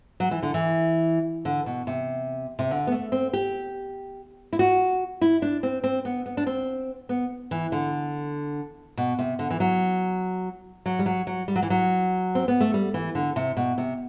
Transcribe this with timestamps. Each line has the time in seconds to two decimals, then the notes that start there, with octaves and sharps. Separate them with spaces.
0.20 F#3
0.31 E3
0.43 D3
0.54 E3
1.45 D3
1.66 B2
1.87 C3
2.59 C3
2.71 D3
2.87 B3
2.92 A3
3.12 C4
3.33 G4
4.53 E4
4.59 F#4
5.21 E4
5.42 D4
5.63 C4
5.84 C4
6.05 B3
6.26 B3
6.37 D4
6.47 C4
7.09 B3
7.51 E3
7.72 D3
8.97 B2
9.19 C3
9.39 D3
9.50 E3
9.60 F#3
10.86 F#3
10.99 G3
11.06 F#3
11.27 F#3
11.48 G3
11.56 F#3
11.63 E3
11.70 F#3
12.35 C4
12.48 B3
12.61 A3
12.74 G3
12.94 E3
13.15 D3
13.36 C3
13.57 B2
13.78 C3